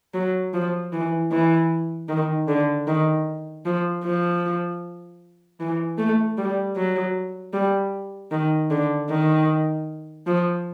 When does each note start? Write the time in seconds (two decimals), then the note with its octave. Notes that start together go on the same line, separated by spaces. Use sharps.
0.14 F#3
0.53 F3
0.93 E3
1.31 E3
2.09 D#3
2.48 D3
2.87 D#3
3.65 F3
4.04 F3
5.60 E3
5.98 A3
6.38 G3
6.77 F#3
7.54 G3
8.31 D#3
8.71 D3
9.10 D#3
10.27 F3